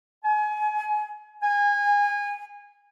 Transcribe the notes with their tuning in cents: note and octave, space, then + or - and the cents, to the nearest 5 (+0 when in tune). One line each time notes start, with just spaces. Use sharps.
G#5 +30
G#5 -25